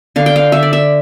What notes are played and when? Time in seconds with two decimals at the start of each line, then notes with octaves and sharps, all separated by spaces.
0.16 D3 F5
0.26 G5
0.36 F5
0.52 D3 E5
0.63 D5
0.73 E5